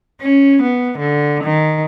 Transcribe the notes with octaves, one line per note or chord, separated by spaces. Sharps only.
C#4
B3
D3
D#3